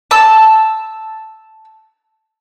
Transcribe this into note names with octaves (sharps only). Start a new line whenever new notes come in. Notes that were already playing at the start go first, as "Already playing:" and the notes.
A5 E6